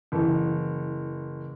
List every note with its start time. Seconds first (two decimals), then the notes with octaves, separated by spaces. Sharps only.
0.12 F#1 E3